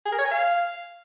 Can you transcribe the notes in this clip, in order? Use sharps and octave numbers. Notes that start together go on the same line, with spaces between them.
G#4
A#4
C#5
G#5
F5